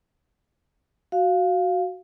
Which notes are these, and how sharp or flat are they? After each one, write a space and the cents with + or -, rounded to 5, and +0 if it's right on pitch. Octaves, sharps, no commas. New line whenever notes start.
F#4 +0 F5 +0